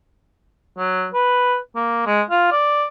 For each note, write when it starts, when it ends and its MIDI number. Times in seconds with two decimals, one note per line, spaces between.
0.78 1.07 54
1.14 1.57 71
1.76 2.05 58
2.06 2.22 56
2.31 2.48 65
2.52 2.86 74